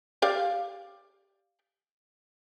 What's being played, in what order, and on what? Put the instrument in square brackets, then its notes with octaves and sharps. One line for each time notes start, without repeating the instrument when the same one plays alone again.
[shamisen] G4 D5 F5